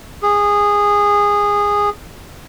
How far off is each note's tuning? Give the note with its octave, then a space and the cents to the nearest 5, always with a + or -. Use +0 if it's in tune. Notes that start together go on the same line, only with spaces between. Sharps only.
G#4 -15